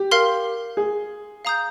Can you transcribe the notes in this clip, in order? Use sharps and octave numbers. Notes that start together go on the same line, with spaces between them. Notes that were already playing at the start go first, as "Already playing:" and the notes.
Already playing: G4
A#4 F5 C6 F6
G#4
F5 A#5 D#6 G6